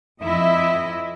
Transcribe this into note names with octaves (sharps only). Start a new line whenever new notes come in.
F2 E4 D#5 E5